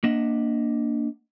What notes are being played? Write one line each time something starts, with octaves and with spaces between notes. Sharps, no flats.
A#3 D4 D#5 E5 F#5